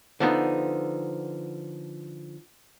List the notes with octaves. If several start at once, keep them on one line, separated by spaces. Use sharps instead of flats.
D3 F3 B3 D#4